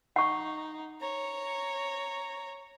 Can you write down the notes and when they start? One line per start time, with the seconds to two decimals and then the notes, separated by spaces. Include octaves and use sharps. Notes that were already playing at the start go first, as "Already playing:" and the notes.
0.16 D#4 F#5 C#6
1.01 C#5 A#5